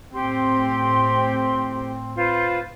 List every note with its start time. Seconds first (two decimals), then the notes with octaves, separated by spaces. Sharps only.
0.13 A2 C4 G4 C6
2.16 F4 B4 C5